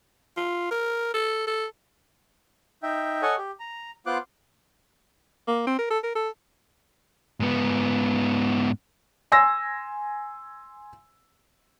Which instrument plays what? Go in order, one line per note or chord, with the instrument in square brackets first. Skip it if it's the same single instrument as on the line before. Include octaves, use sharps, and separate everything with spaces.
[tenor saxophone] F4
A#4
A4
A4
[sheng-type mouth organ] D#4 E5 G5
A4 C#5 D#5 F#5 G#5
G4
A#5
B3 F4 C5 D6 F#6
[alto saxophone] A#3
C4
A#4
A4
A#4
A4
[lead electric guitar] G#2 B3
[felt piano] G#5 C6 E6 A#6